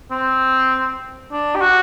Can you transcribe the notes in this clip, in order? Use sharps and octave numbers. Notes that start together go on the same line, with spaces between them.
C4
D4
G4
F#4